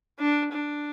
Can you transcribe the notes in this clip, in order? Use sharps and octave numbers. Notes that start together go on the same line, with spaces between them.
D4
D4